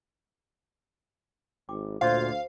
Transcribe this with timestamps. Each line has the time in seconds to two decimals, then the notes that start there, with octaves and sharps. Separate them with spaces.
1.69 G#1 G5 D6
2.01 D2 A#2 F4 F#4 C5 F5